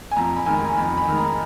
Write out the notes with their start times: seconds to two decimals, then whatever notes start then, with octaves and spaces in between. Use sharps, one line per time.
0.11 G#5
0.16 F2 A#5
0.36 B5
0.46 D#3 G#3 G#5
0.57 A#5
0.77 F2 B5
0.97 B5
1.08 D#3 G#3
1.18 A#5